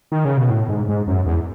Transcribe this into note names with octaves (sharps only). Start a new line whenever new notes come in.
D#3
C#3
B2
A2
G#2
G#2
F#2
E2